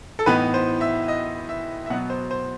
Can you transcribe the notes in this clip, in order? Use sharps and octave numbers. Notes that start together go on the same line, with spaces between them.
A4
A2 E3 B3 D#4 B4
C5
E5
D#5
E5
E5
B2 F#3 B3 F#5
C5
C5